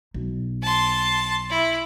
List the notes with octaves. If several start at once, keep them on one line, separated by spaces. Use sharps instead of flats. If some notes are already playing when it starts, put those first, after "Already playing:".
B1
A5 C6
E4